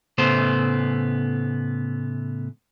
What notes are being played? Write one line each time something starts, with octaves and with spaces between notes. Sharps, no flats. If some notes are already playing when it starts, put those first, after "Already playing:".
A2 C#3 A3 B3 A4 C5